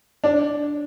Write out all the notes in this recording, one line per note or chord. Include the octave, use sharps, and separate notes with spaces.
D4